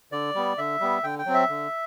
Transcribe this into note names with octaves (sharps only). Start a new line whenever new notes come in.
D3 D5
G3 B3
D3 E5
G3 B3
D3 G5
G5
F#3 C4
E5
D3